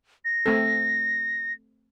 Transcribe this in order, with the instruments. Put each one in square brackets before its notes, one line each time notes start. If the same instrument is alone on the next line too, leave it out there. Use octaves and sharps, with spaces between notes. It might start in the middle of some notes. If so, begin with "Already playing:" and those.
[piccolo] A#6
[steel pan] A3 C4 A4